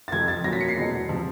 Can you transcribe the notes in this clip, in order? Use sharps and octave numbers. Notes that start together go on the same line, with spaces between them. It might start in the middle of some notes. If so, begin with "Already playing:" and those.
A6
F2 C3 F3 G#6
A6
A#2 F#3 A#6
B6
C#7
C7
E2 B2 G#3
C3 F3